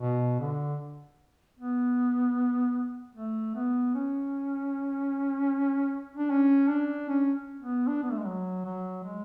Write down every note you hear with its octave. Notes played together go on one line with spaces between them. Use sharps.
B2
D3
B3
A3
B3
C#4
D4
C#4
D4
C#4
B3
D4
B3
A3
G#3
F#3
F#3
G#3